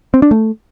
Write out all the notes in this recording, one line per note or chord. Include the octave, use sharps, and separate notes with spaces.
C4
D4
A3